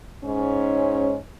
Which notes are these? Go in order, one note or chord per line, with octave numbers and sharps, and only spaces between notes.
G#2 C#4